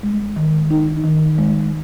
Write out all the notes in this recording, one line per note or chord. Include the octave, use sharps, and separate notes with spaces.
G#3
D#3
D#4
D#3
G#3